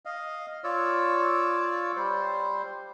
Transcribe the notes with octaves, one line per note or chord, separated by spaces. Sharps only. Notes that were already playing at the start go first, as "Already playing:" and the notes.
D#5 F5
F4 C#5 D5 E6
G3 C5